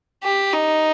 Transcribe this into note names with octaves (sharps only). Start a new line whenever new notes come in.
G4
D#4